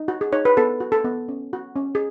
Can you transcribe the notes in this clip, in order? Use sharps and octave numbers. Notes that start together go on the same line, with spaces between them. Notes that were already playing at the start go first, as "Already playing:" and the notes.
Already playing: D#4
F#4
G#4
D#4 C#5
B4
B3 A4
F#4
A4
B3
C#4
F#4
C#4
G#4